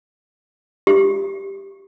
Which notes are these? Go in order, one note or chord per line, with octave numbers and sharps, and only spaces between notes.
G4